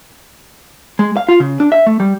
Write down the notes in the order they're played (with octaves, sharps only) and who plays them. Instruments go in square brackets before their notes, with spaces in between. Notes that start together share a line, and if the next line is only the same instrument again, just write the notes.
[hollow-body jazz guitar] G#3
F5
F4
C#3
D4
E5
A3
G3